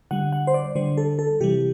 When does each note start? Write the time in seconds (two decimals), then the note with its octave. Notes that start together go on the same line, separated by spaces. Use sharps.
0.11 D3 G3 F#5
0.32 F#5
0.47 C5
0.54 D5
0.75 D3 G3 C5
0.97 A4
1.19 A4
1.40 C3 E3 G3 G4